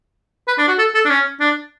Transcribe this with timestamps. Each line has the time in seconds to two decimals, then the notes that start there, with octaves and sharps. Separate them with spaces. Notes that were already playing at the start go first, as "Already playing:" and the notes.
0.48 B4
0.58 D4
0.68 F#4
0.79 A4
0.95 A4
1.05 D4
1.10 C#4
1.40 D4